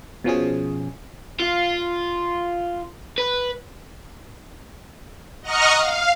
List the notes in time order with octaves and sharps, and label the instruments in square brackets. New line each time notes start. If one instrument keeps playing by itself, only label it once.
[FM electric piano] B2 F3 C#4 G#4
[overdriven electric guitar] F4
B4
[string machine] D#5 F#5 A#5 C#6 D#6 F6
F5